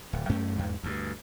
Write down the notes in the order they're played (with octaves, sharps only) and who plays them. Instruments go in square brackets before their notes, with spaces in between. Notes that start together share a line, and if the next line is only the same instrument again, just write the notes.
[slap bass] D1
F#2 A3 C#4
E2 G#2
D2 G2